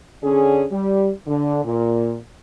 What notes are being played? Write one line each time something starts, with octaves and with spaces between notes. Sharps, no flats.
D3 C#4 G#4
G3
D3
A#2